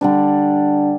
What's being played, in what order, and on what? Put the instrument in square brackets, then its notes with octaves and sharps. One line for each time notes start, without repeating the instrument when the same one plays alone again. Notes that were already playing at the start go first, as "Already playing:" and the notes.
[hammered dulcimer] D3 G3 D4